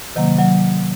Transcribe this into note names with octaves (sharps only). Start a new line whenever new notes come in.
C3 D#3 F#3 A#3
F#3